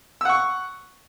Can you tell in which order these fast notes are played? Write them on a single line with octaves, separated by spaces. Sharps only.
E6 F#5 C#6